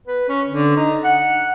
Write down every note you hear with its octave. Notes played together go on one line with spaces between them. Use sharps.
B4
C#4
D3
D#4
F#5